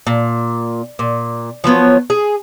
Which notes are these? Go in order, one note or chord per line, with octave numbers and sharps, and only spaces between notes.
A#2
A#2
F3 F#3 B3 C#5
G#4